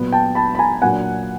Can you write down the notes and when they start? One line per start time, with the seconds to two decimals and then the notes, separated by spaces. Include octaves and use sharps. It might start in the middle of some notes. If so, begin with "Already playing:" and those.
Already playing: A#2 F#3 B3
0.13 G5 A5
0.35 A5 B5
0.55 B5
0.59 G#5 A#5
0.82 A#2 F#3 A#3 D4 F#5 G#5